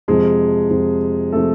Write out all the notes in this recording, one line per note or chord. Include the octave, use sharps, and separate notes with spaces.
F2 C3 F3 G#3 G#4
F2 C3 F3
C3 F3 A3 A4